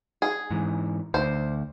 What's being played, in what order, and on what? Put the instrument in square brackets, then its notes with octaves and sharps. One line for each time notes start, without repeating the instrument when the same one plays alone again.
[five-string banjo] G#4
[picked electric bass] G#2 E3
[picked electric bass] D2 [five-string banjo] C5